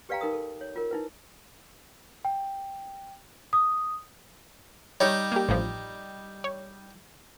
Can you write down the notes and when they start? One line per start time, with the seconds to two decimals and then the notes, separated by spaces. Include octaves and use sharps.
0.09 G4 B4 D5 F5 G5 A#5
0.21 D#4 A#4 D#6
0.33 A4
0.61 C#5
0.76 F4 A#4
0.91 D#4 E4 B4
2.25 G5
3.53 D#6
5.01 G3 D#4 C#5
5.32 A#3 G4
5.49 A1 G2 F3
6.44 C#5